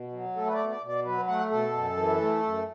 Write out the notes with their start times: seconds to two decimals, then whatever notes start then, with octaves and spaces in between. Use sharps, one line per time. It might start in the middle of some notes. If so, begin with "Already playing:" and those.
Already playing: B2
0.13 F#3
0.36 A3 A4
0.47 B4
0.53 D5
0.58 B2
0.70 D5
0.82 B2
0.88 D5
1.05 F#3 B4
1.27 A3 F#5
1.51 B2 A4
1.74 F#2
1.96 E3
2.20 A3
2.43 F#2